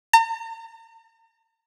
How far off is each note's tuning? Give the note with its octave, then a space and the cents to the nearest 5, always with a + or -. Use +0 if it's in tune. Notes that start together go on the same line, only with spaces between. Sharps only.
A#5 -45